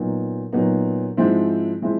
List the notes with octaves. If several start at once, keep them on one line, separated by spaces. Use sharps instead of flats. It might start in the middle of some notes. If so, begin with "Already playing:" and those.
Already playing: A#2 F#3 B3 D#4
A#2 F#3 B3 D#4
G#2 F3 G#3 C4 E4
F3 G#3 C4 E4